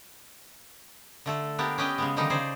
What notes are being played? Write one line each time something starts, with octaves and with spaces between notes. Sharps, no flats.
D3 A3 A4
A#3 B3 D4 G4 A#4
C#4 G4 B4 D#5 G5
C#3 G#3 B3
D3 D#3 F3 G3 D#4
C#3 D#4 G#4 C5 D5